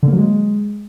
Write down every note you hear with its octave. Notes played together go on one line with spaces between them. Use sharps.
D3
A#3
F#3
G#3